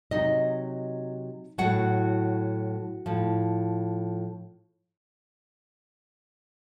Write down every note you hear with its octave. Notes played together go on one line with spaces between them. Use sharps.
C3 F#3 D#4 D#5
A2 F#3 F#4 F#5
A2 F3